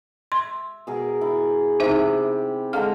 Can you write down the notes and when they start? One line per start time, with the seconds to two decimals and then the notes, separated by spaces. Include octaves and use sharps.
0.32 E5 C6
0.87 B2 G#4 A#4
1.21 E4
1.80 C3 D#4 G4 C5 E5 B5
2.73 D3 G#3 F5 A#5 F6